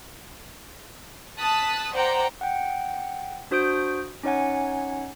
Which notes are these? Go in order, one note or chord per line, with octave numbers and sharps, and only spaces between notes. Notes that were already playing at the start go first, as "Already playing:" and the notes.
A5 D#6 F#6 B6
C5 D5 F#5 G5 A#5
F#5 G5
D4 F#4 C5 D#6 G6 D7
C#4 D#4 C#5 F#5 G#5